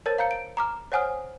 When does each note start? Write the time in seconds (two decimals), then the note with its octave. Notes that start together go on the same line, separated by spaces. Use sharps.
0.06 A#4 C5 C#5 A5 A6
0.18 F5 A#5 G6 C#7
0.31 D7
0.57 A#5 D6 F6
0.92 C5 C#5 F#5 G#5 D#6 F6